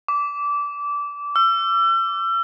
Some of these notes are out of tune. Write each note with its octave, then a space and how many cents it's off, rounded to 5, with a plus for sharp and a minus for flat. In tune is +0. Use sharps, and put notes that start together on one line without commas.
D6 -20
E6 +40